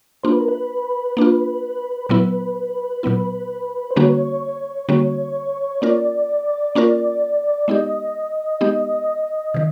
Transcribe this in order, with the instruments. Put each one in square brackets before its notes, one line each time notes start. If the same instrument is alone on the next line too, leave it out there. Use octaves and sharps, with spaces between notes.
[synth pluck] A#3 D4 F4 [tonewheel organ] C5
[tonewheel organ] B4
A#4
B4
[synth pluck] A#3 D4 F4
[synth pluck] A#2 F#3 B3 E4 [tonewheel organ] B4
[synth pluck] A#2 F#3 B3 E4
[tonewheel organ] C5
[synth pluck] D3 G3 A#3 C#4 F#4 [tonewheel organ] C#5
[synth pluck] D3 G3 A#3 C#4 F#4
[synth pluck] A#3 C#4 F4 A#4 [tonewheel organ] D5
[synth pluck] A#3 C#4 F4 A#4
[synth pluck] G#3 B3 D#4 G4 [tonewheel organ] D#5
[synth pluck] G#3 B3 D#4 G4
C3 D#3